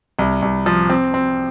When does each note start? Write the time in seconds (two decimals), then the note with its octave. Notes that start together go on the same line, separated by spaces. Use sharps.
0.19 C2
0.42 C2
0.66 F3
0.89 C4
1.14 C4